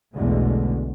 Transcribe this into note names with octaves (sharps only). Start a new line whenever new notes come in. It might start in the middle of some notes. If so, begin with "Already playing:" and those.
B1 E2 B2 D3 G#3 A3